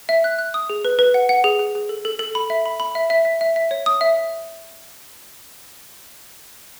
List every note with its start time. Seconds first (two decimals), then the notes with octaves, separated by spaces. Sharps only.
0.09 E5
0.24 F#6
0.38 F#6
0.54 D#6
0.70 G#4
0.85 B4
0.99 B4
1.14 F#5
1.29 F#5
1.44 G#4
1.59 G#4
1.75 G#4
1.89 A4
2.05 A4
2.19 A4
2.35 B5
2.50 E5
2.66 B5
2.80 B5
2.95 E5
3.10 E5
3.25 E5
3.41 E5
3.56 E5
3.71 C#5
3.86 D#6
4.01 E5